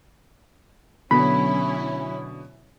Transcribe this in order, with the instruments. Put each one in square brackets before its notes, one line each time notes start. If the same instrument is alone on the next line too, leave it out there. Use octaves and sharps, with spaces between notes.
[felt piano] B2 D3 [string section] F#3 C#4 E4 [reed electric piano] B5